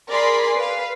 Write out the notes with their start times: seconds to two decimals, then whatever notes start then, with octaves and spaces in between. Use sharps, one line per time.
0.10 G#4 A#4 D5 B5 C6
0.58 B4 F5